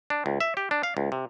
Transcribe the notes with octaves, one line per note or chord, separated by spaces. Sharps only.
D4
C#2
E5
G4
D4
F5
C#2
C3